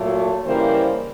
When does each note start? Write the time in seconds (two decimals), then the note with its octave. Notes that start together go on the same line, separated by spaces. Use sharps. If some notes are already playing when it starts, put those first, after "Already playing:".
Already playing: A#2 F#3 A3
0.44 C#3 E3 G3 A#3 A#4 C5